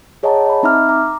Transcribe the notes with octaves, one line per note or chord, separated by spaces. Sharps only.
G#4 C#5 D#5 F#5 A5 A#5
D#5 B5
C4 D#4 E5 A#5 D6 F6
A#5 D6